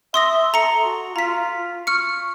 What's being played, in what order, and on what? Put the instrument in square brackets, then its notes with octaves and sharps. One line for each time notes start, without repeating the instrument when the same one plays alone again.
[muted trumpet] E5 [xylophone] C6 D#6 A#6
[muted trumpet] A4 [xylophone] A#5 C6 C#7
[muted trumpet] F#4
[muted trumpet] F4 [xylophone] A#5 B6
[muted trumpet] C#6 [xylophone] F6 C#7